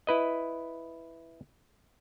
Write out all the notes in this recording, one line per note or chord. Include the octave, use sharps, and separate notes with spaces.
E4 B4 D#5